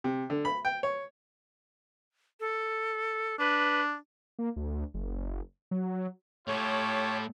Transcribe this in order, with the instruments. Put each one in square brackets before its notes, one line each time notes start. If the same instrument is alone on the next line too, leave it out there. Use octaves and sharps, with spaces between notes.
[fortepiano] C3
D3
B5
G5
C#5
[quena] A4
[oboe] D4 [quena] B4
[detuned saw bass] A#3
D2
F#1
F#3
[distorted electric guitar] A2 [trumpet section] F4 G4 A4 [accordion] C#5